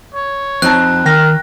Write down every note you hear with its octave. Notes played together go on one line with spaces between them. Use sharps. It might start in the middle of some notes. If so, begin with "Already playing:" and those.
C#5
F2 C4 D#4 A5 F#6
D#3 A#4 G5 A#6